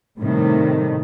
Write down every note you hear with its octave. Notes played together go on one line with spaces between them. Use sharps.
A2 C3 D#3 G3 A3